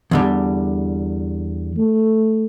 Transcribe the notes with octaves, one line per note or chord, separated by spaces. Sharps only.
E2 D3 G3
A3